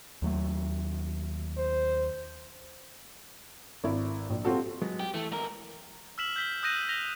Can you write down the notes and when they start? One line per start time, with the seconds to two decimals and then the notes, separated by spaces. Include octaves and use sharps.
0.22 D#2 F#3 A3
1.57 C5
3.84 G#1 E4
4.30 A#1
4.45 G3 C4 F4 F#4 A4
4.82 F#3 G#3 B3
5.00 G4
5.14 E3 A3
5.32 G#2 A#4
6.18 E6 F6 B6 E7 F#7
6.36 G6 B6 G7
6.63 D#6 F#6 G6 A#6 D#7 E7
6.89 A#6 F7 G7